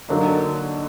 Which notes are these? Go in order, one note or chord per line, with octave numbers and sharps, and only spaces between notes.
D3 F#3 A#3 D#4